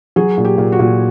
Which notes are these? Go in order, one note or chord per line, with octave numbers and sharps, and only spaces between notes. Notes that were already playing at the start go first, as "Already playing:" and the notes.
F#3 G#4
A#2
G4
A#2
F#4
A#2